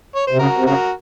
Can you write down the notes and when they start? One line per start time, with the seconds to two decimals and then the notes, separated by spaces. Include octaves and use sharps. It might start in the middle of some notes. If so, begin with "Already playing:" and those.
0.16 C#5
0.27 C3 C5
0.38 C#3 F#4 A#4
0.56 C3
0.66 C#3 F#4 A#4